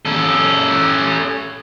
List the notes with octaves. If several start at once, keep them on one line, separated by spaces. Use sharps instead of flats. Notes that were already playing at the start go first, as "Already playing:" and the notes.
C#4 A4